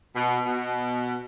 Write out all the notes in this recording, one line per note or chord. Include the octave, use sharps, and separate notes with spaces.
B2
B2